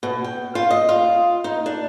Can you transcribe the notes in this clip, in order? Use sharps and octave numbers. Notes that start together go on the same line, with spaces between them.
B2
G5
F4
D#5
F4
D#4
D4